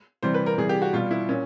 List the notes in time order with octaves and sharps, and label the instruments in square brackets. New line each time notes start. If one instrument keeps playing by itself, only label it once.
[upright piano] C3 E3 G3 C5
B4
A#4
C3 E3 G3 G#4
G4
F#4
B2 G3 F4
E4
A#2 C#4